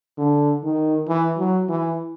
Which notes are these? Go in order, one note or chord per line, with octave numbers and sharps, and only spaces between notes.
D3
D#3
E3
F#3
E3